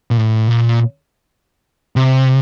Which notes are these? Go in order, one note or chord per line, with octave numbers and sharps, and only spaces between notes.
A#2
A2
A#2
C3